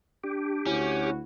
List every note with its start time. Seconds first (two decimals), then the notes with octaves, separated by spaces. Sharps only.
0.24 D4 G4
0.66 D2 C#4 E4 F#4